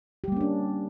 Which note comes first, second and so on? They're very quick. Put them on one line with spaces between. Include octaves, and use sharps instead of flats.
G4 G3 A#3 C#4 D4